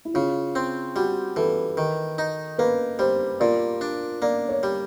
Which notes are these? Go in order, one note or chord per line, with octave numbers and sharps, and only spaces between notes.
E4
C#3 F4
C4
G3 F#4
E3 A4
D#3
D#4
A#3 B4
G3 C5
A#2 D5
D4
A#3 D5
C#5
G3